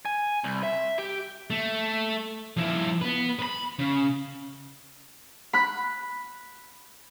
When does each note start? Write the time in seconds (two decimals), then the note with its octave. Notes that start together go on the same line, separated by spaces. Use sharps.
0.05 G#5
0.44 C2
0.63 E5
0.99 G4
1.50 A3
2.57 F3 E4
3.01 B3 B4
3.39 B4 B5
3.79 C#3
5.53 B5 F#6